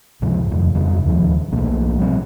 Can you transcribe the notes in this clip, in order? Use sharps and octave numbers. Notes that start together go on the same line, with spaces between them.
C#2 G#2 C3 F3
D#1 F2
F2 C#3 G3
D1 D#2 C#3 F3
B1 B2 A3 A#3
F3 G3 C4